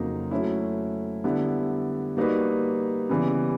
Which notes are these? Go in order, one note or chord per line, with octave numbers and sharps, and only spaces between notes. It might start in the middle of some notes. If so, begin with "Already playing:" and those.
Already playing: F2 C#3 F#3 A#3 D#4
F#3 A3 C#4 E4
D3 G3 B3 E4
G3 A#3 D#4 F#4 B4
C#3 E3 G3 B3